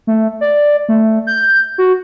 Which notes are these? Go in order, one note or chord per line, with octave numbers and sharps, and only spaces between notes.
A3
D5
A3
G6
F#4